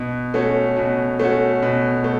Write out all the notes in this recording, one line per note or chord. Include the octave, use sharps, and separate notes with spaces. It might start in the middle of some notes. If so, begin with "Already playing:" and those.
Already playing: B2
A3 C#4 F#4
B2
A3 C#4 F#4
B2
A3